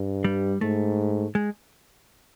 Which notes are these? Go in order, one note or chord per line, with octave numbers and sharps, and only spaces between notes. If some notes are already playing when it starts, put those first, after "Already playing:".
Already playing: G2
G3
G#2 A3
G#3